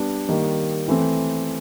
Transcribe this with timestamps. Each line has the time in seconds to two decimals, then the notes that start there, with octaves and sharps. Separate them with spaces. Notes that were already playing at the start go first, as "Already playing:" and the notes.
Already playing: G3 B3 D4
0.29 D#3 G3 A#3
0.88 E3 A3 C4